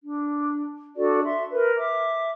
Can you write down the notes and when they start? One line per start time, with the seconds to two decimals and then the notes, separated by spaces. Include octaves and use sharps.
0.03 D4
0.96 D4 F#4 A4 D5
1.24 E5 C6
1.51 A#4 B4
1.76 E5 D6